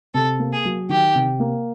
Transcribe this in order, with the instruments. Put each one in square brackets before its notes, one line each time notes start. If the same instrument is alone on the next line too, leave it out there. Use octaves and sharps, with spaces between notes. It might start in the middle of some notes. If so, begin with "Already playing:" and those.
[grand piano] C3 [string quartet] A4
[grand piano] A#3
[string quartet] G#4
[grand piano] F#3
[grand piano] D#3 [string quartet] G4
[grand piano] C3
A#3